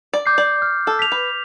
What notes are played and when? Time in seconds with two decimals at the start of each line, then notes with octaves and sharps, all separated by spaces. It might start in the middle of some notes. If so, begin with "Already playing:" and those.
0.13 D5
0.26 D6 G6 C7
0.38 D5
0.62 F6
0.87 A4
0.99 B6 F7
1.12 B4